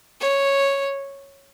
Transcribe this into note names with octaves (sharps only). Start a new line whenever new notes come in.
C#5